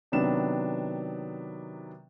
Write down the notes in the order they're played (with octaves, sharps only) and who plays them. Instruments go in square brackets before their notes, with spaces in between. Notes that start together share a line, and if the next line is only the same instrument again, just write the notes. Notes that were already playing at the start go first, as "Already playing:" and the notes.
[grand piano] C3 D#3 F#3 B3 D4 E7